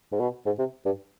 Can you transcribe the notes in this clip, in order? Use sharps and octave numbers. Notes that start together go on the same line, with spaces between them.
G#2
B2
G#2
C3
G2